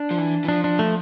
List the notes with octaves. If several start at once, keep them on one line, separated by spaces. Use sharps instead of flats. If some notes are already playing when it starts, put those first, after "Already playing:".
Already playing: D4
F3
E3
E3
F3 D4
D4
A3